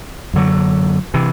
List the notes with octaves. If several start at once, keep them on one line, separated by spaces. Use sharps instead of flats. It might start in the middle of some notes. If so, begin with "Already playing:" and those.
F#2 D3 F#3
C3 E3